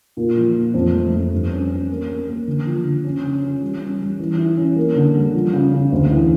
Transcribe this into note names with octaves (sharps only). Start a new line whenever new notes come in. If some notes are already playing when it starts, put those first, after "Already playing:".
A#2
F3
A#2
F2
A3
F2
G2
C#4
C#4
A#3
A#3
A#3
D3
F3
D3
C#4
C#3
C#4
G3
C#4
G3
E3
E4
C#4
A#3
D3
G3
F3
C#3
C#3
D2
E3